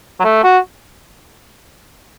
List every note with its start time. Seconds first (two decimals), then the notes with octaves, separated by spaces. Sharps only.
0.20 F#3
0.24 A3
0.44 F#4